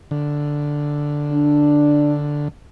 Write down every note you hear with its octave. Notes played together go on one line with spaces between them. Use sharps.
D3
D4